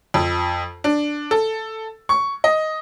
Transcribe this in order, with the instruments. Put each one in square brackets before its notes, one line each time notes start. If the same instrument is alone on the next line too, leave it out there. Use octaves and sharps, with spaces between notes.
[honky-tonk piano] F2
D4
A4
C#6
D#5